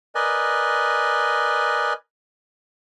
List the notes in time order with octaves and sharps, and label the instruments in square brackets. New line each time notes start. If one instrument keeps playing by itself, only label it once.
[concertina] A#4 B4 D5 D#5 G#5